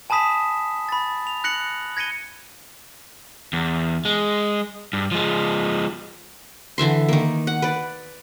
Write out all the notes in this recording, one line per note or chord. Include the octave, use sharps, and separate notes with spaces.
G#5 A5 B5 D#6 B6 E7
B5 A6
F7
F#6 A#6 C#7 F#7
G#6 A#6 C#7 D#7 G7
E2
G#3
G2
F3 G#3
D3 E3 E5 C6
D#3 A#3
F#5
B4 D5